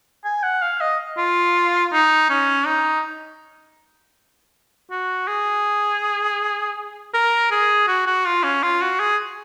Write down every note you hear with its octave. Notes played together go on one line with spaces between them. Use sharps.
G#5
F#5
F5
D#5
F4
D#4
C#4
D#4
F#4
G#4
A#4
G#4
F#4
F#4
F4
C#4
F4
F#4
G#4